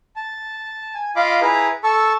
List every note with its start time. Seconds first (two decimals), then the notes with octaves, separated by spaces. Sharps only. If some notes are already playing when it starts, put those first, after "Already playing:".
0.16 A5
0.94 G#5
1.16 F4 D#5 F5 B5 D6
1.41 E4 G#4 B4 A#5
1.84 A4 A5 C#6 E6